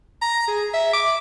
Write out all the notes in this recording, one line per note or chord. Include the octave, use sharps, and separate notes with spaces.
A#5
G#4
E5
D6